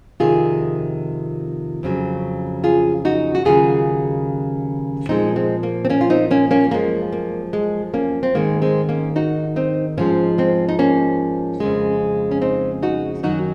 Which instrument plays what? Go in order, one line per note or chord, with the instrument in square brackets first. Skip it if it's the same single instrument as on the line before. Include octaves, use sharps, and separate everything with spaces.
[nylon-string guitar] F2 C3 D#3 F4 G#4
F2 C#3 F#3
F4 G#4
D#4 F#4
F#4
D#2 C#3 F#3 F4 G#4
A#2 F3 G#3 C4 D#4
G#3 C4
A#3
C4
A#3 C#4
F4
C4 D#4
A#3 C#4
A#3 C#4
F#2 F3 G#3 A#3
A#3
G#3
A#3 C#4
C4
G#2 D#3 G#3 A#3
G#3 C4
A#3 C#4
D#4 F#4
C4 D#4
G#2 F3 G#3 A#3 C#4
G#3 C4
D#4
A#3 C#4
F2 C#3 G#3
C#4
C4 D#4
D#4 F#4
F#2 D#3 F#3 D#4 F#4